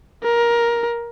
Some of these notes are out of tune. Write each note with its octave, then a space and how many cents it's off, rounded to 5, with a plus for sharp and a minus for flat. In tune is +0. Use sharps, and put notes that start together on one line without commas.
A#4 +15